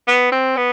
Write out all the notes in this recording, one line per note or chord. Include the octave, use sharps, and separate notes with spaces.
B3
C4
B3